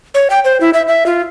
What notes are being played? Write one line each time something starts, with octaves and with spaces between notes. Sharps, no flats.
C#5
G5
C5
E4
E5
E5
F4